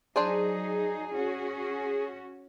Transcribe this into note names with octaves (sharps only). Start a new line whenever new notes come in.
F#3 D4 D#4 G#4 C5 D5
C#4 F#4